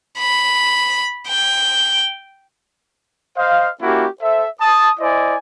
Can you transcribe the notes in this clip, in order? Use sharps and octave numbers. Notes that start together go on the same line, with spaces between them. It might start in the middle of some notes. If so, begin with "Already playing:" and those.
B5
G5
C5 D#5 F5
A#3 C#4 E4 F#4 G4
A4 C5 E5
A5 D#6
E4 C5 D5 D#5 G#5